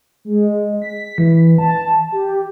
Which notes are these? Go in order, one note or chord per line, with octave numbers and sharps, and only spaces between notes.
G#3
B6
E3
A5
G4